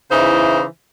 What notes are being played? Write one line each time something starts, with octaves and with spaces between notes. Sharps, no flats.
C#3 E3 D#4 E4 C5